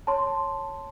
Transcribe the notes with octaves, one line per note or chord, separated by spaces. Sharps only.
C#5 A5 C6